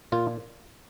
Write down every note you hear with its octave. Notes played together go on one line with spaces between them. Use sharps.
A#2 F4